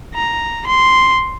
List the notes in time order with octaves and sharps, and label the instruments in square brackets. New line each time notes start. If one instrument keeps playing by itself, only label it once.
[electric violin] A#5
C6